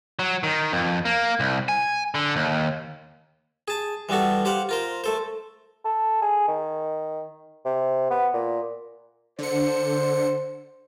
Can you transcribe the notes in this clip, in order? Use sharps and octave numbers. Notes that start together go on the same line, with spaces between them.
F#3
D#3
F2
A#3
C2
G#5
D3
D#2
G#4 A5
E3 G3 B3 F#4 A4
G4 C5 F5 F#5
F4 A#4 C5
A3 A4 C5
A4
G#4
D#3
C3
B3
A#2
D3 C5 C#7